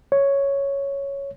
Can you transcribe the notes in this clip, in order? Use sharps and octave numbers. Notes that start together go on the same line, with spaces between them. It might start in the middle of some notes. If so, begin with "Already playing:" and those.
C#5